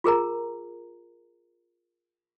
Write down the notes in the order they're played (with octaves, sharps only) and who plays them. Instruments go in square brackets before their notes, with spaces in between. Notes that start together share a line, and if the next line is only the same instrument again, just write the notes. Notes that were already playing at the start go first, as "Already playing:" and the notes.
[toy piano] F4 G#4 A#4 A#5